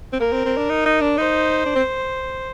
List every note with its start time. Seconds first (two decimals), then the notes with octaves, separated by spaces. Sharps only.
0.13 C4
0.20 A#3 A#4
0.32 C4
0.45 C4
0.57 D4
0.69 D#4
0.86 D#4
1.01 D4
1.17 D#4 C5
1.66 D4
1.75 C4